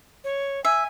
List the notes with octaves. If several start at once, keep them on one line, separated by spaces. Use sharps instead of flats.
C#5
E5 G#5